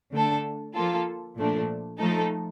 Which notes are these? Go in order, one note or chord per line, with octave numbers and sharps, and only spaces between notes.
D3 A3 D4 A4
F3 A#3 F4 A4
A#2 F3 A3 D4
F3 A3 D#4 A4